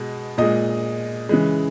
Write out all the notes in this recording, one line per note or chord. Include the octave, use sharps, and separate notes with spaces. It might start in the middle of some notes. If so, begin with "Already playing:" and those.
Already playing: B2 G#3
A#2 G#3 D#5
C#3 E3 G#3